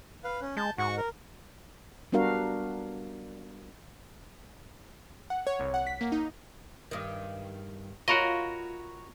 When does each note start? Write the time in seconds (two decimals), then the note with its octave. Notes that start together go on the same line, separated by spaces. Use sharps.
0.24 B4 F5
0.42 C#4
0.57 G#3 A5 G6
0.78 G#2 F#4 F#5 C#6
0.97 A#4
2.12 G3 B3 D4 F#4 A#4 F5
5.30 F#5
5.47 C#5
5.60 C2
5.74 F#5
5.87 B6
6.01 A#3
6.12 D#4
6.91 G2 D#3
8.08 F4 F#4 A#4 C#5 D#5 A#5 B5